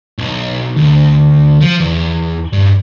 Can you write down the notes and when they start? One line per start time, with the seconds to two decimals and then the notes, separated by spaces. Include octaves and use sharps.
0.18 B1
0.77 D2
1.61 F3
1.80 E2
2.53 G2